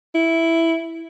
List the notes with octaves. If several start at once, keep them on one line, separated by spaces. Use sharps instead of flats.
E4